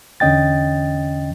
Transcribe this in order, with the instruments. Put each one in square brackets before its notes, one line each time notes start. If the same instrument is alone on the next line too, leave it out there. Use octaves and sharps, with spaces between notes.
[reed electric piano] E2 D3 C#4 D#5 G5 A6